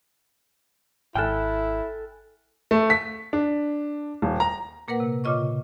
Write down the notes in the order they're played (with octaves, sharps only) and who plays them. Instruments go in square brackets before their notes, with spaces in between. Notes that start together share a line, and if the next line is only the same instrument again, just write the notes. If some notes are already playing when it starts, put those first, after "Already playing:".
[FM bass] G#1 [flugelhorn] E4 [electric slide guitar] A4 G5 [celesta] G#5 F6 F#6
[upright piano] A3
B6
D4
D#1
A#5
[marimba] A#2 A#3 A#4 B4 F#5
C3
A#2 C#3 F4 D#5 C#6